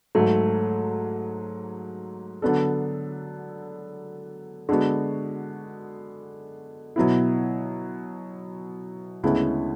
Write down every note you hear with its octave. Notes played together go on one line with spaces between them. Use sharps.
G#2 F#3 A3
D3 F#3 B3 D4 A4
D3 G#3 B3 F#4
B2 F#3 B3 E4
D2 C#3 G#3 B3 E4